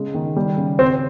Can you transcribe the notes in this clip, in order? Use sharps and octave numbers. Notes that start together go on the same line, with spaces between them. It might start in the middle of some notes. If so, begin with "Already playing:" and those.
Already playing: C#3 G#3
D#3
G3
C#3
C4 C#4